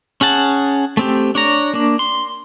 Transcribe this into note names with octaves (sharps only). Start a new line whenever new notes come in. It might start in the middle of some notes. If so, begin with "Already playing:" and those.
C#4 G#4 F#5 A5
A3 C4 G4
D4 C#5 A#5
A#3 D4
C6